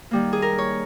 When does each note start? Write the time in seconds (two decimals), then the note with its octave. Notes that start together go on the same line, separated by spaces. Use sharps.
0.11 D#3 G3 A#3
0.33 G#4
0.42 A#4
0.58 C#5